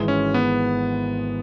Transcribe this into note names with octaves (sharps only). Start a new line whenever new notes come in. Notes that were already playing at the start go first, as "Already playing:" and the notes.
Already playing: G#1 G#2 E3 G#3
C#4
B3